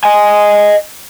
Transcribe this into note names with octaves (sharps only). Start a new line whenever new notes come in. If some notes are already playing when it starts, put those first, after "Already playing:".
D#5 G#5